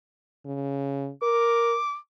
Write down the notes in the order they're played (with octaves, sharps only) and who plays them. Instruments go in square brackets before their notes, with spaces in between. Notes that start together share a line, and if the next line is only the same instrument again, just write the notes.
[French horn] C#3
[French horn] A#4 [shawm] D6